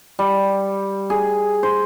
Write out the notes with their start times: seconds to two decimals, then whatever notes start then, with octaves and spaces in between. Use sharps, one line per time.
0.19 G3
1.10 G#4
1.63 C5